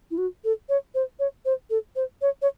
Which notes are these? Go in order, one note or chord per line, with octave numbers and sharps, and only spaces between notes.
E4
F#4
A4
C#5
C5
C#5
C5
A4
C5
C#5
C#5